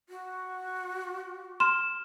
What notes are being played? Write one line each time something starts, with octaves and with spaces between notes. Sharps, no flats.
F#4
C6 F6 E7